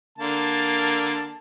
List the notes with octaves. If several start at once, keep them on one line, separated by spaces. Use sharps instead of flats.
D3 A#3 A5